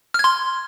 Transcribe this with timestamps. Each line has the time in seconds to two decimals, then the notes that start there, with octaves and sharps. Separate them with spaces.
0.14 F6
0.19 G#6
0.24 C6